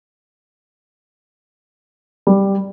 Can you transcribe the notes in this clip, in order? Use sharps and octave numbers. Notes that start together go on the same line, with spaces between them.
G3